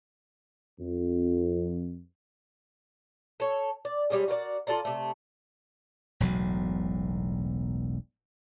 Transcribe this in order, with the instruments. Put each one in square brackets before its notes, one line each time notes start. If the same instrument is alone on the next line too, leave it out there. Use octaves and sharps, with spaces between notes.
[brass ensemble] F2
[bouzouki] A4 C#5
D5
G3 G#3 C#4 G#4
F#4 A#4 B4 D5
F4 A4 D5 A#5
C3 A3
[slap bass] E1 B1 A2 F#3